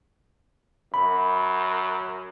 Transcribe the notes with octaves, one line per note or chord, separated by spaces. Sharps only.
F#2 B5